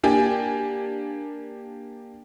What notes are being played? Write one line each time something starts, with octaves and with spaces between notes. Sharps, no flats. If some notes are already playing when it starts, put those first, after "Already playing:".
A#3 D4 G4 G#5